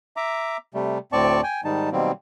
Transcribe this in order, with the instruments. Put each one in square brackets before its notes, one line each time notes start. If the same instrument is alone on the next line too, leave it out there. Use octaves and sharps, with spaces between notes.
[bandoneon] E5 A#5 D6
C3 G3 A3
D2 A2 C4 D5 A5 C#6
G5 G#5
G#2 D#3 G3 D#4 A5
B2 D#3 F#3 G3 A#3 C4